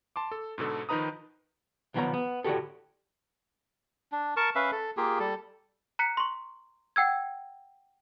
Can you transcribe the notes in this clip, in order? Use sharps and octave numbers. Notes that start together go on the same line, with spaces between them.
A5 C6 D6
A4
G#2 B2 D3 A4
D#3 F3 D#4 B4 A#5 D#6
B1 D#3 F3 B3 C#5 A#5
B3
A2 D3 F#4 G4 A4
D4
A#4 A5 C#6
C#4 B4 E5 F5
A4
A#3 F4 G4 G#4
G3 A4
A#5 F#6 B6 C#7
C6 C#6
F#5 G5 E6 G#6